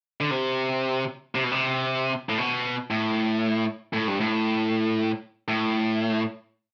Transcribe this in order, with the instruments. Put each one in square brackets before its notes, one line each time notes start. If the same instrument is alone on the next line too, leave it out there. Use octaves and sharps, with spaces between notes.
[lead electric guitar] D3
C3
C3
B2
C3
A2
B2
A2
A2
G2
A2
A2